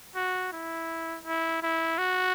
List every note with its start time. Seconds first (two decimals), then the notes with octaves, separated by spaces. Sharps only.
0.16 F#4
0.52 E4
1.25 E4
1.63 E4
1.98 F#4